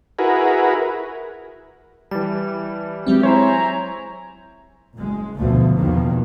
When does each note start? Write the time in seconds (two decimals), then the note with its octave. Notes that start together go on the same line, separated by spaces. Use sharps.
0.19 E4 F#4 G#4 A#4 B4
2.11 E3 G3 A5
3.07 F#3 G#3 C4 G4 E5
3.23 E4 C5 C#5 G#5 A#5
4.96 F#1 G#3
5.37 F#1 D2 B2 F3 A3
5.77 E2 B2 D#3 F3 A#3